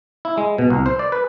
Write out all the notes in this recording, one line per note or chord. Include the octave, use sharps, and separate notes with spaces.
E4
G#3
B2
C2
C5
D5
B4